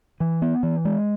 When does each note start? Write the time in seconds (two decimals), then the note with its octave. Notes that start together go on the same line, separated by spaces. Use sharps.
0.20 E3
0.42 B3
0.63 E3
0.85 G#3